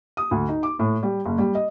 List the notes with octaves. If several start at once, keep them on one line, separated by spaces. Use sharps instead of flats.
D#6
D2
D#4
D6
A2
G3
F#1
G3
D#5